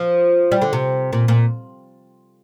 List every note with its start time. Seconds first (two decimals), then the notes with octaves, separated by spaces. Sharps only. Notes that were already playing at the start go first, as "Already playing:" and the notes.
Already playing: F3
0.52 G3
0.62 D3
0.73 C3
1.13 A#2
1.28 A#2